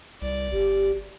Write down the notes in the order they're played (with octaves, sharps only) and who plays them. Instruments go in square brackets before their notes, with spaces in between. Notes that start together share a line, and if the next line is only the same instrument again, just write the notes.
[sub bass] C2 [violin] D5
[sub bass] G1 [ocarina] G4